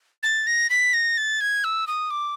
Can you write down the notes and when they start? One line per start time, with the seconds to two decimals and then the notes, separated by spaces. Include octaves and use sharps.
0.23 A6
0.47 A#6
0.70 B6
0.93 A#6
1.17 A6
1.41 G#6
1.64 E6
1.87 D#6
2.11 D6